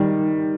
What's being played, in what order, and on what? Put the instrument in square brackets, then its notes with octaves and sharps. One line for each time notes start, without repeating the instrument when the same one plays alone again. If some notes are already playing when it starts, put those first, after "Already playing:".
Already playing: [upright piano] D#3 G3